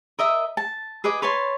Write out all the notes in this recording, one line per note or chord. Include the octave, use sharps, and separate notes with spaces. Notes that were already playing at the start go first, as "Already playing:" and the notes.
A#4 D#5 E5 D#6
A5
G#4 B4 D#5 D6
B4 C#5 A5 C6